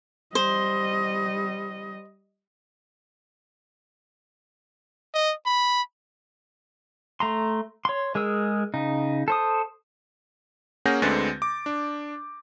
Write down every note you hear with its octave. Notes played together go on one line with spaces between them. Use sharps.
G3 C5 D#5
D#5
B5
A3 A#5 C6
C#5 C6
G#3 G#4 A#4 E6
C#3 D#4
A4 C5 D#6
A#3 C#4 G#4 F#5 G6 A#6
D2 D3 G#3 C4 B4 A6
D6
D4